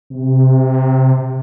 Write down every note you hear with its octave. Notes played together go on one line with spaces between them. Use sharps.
C3